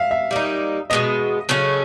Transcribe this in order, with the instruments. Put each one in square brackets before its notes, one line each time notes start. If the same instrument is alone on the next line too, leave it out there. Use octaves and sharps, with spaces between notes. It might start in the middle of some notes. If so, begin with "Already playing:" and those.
Already playing: [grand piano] E5 F5
E5
[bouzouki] G3 A#3 D#4
[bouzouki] B2 G#3 B3 [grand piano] D#5
[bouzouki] C#3 F#3 A3 C#4